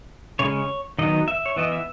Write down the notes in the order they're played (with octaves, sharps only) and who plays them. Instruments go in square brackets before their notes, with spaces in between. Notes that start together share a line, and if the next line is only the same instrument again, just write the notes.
[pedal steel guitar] C#3 G#3 C#4 C#5
D#3 F#3 B3 D#5
E5
C#5
E3 B3 D#5
E5